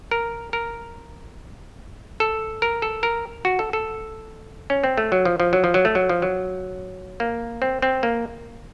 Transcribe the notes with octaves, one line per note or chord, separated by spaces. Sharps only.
A#4
A#4
A4
A#4
A4
A#4
F#4
A4
A4
C#4
C4
A3
F#3
F3
F3
F#3
F3
F#3
A3
F#3
F3
F#3
A#3
C4
C4
A#3